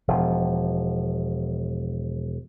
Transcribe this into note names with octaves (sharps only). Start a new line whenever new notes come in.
E1 F3